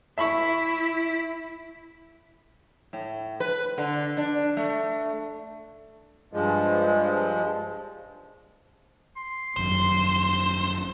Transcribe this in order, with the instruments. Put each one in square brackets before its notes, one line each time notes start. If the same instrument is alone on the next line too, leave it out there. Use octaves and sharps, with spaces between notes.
[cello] E4 [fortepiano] E5 B5 C#6
[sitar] A2
B4
D3
D4
A3
[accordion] G2 F3 G#3
[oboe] C6
[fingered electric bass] G#1 F#2 [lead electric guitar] C5